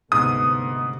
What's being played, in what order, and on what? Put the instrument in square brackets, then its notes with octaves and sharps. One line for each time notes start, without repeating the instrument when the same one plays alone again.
[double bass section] D2 C3 [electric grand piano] G#2 B3 [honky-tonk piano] D#6